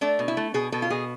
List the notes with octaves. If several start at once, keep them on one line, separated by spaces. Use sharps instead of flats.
A3 D4
B2
E4
A3
B2 G#4
B2 A4
F4
B2 G#4